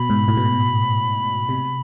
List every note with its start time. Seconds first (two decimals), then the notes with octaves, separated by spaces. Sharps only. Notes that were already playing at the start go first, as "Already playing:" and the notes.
Already playing: B2 B5
0.10 G#2
0.28 A2
0.37 B2
1.49 C3